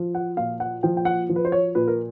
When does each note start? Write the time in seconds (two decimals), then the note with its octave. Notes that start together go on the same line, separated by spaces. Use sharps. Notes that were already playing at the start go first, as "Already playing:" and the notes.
Already playing: F3
0.15 F#5
0.37 A#2 F5
0.60 F#5
0.83 F3 G5
0.97 G5
1.05 F#5
1.29 F3
1.36 B4
1.45 C5
1.52 C#5
1.75 A#2 B4
1.88 A#4